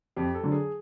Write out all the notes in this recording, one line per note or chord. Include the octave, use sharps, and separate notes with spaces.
F2 G4
A4
D3 F#3
G#4